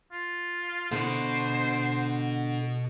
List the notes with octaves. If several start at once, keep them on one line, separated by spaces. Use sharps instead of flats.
F4
B2 D3 C5